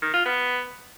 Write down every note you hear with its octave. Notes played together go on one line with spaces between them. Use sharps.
D#3
F4
B3